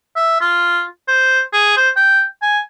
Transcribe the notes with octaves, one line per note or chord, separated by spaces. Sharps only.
E5
F4
C5
G#4
C5
G5
G#5